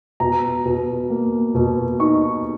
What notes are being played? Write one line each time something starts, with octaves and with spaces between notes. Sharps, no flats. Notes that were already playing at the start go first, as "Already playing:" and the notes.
B2 A#5
B2
A#3
B2
D#4 C#6